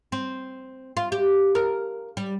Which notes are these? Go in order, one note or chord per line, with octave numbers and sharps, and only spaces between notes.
C4
F4
G4
A#4
G3